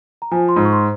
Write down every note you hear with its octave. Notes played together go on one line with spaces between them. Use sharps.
A#5
F3 G#5
C6
G#2
C#6
C6